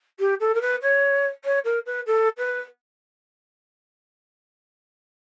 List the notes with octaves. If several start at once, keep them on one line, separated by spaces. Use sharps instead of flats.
G4
A4
A#4
B4
C#5
C#5
A#4
B4
A4
B4